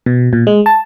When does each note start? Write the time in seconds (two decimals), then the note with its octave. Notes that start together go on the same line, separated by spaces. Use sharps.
0.06 B2
0.33 A#2
0.47 G#3
0.66 A5